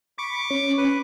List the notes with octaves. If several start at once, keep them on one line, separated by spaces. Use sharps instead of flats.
B5 C#6 D6
C#4
B4